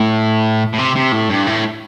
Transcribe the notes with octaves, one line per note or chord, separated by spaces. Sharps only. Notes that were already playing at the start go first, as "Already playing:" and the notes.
Already playing: A2
A2
C3
C3
A2
G2
A2